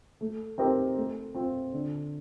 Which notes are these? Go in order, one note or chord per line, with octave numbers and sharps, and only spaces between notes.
A3
C4 D#4 G4 A#4
A3
C4 F4
D3